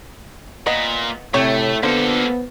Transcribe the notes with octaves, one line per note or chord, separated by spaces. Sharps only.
A#2 B3 D#5
A2 C3 A3 C#5 G5 G#5
D3 A#3 B3 F4 A4 C5